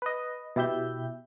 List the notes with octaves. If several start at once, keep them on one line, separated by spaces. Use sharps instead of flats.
B4 D#5
B2 E4 G4 E5 G6